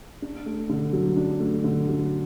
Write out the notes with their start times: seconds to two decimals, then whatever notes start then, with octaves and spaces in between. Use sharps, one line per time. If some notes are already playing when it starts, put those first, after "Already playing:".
0.22 D4
0.46 A3
0.69 D3
0.93 F#3
1.17 D4
1.40 A3
1.64 D3
1.88 F#3